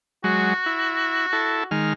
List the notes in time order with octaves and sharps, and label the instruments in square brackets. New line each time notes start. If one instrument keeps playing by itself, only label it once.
[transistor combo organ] F#3 G#3 [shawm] F#4
[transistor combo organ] E4
E4 A4
D#3 G#3 F6